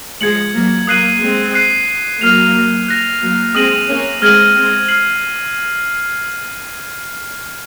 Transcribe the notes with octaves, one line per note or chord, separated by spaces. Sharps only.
F3 G#3 G#6 C#7 F#7
F#3 A#3
F#3 A#3 D#6 F#6 C7 D#7 F#7
G#3 C4
F#6 C7 D#7
F#3 A#3 F6 C7 F7
F#6 A#6 F7
F#3 A#3
G#3 C4 D#6 A#6 D#7 F#7
A#3 C#4
G#3 C4 F6 G#6 D#7 F#7
G#3 C4
F6 C7 F#7